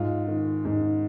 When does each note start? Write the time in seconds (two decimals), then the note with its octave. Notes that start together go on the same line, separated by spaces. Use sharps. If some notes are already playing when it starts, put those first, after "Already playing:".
Already playing: G#2 F4
0.28 D#3
0.65 G#2